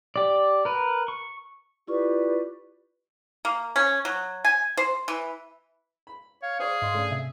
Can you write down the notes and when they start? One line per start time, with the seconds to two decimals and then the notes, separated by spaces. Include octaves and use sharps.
0.16 G4 D5
0.65 A#4 B4
1.08 C#6
1.87 E4 F4 G4 B4 D5 C#6
3.45 A#3
3.76 C#4
4.05 F#3
4.45 G#5
4.77 C5
5.08 E3
6.07 B5
6.42 C#5 F5
6.59 G#4 C5 D5 C#6
6.82 G#2 D#5 C6
6.94 C#3 A3 D4
7.11 C3 E5